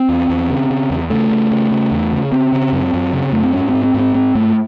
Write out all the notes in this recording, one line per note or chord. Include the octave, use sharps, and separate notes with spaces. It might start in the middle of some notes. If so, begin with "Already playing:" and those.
Already playing: C4
E2
E2
C#3
C#3
E2
C#3 A3
C#3
C#3
C#3
E2
C#3
C#3 C4
C#3
F#2
F#2
C#3
F#2 A3
C4
G#2 C#4
G#2 C4
C4
G#2
C4
G#2 C4
G#2 A3